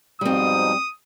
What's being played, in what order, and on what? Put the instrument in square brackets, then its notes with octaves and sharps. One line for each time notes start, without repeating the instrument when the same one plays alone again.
[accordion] G#2 B2 F3 [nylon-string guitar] G3 C4 [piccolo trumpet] D#6